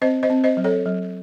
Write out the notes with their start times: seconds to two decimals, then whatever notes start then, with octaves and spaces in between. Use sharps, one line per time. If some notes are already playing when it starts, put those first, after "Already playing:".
0.02 C4 C5 D#5
0.23 C5 D#5
0.30 C4
0.44 C5 D#5
0.57 F#3
0.64 A4 C#5
0.85 F#3